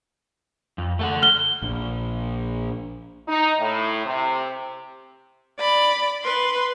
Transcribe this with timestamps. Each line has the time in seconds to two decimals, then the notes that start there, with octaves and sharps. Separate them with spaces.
0.78 F2
0.99 A3 A4 F#5
1.22 F6 G7
1.63 A#1
3.27 D#4
3.59 A2
4.05 C3
5.59 D5 B5
6.24 B4 C6